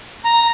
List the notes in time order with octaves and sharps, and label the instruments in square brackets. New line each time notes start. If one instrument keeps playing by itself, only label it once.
[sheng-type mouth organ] A#5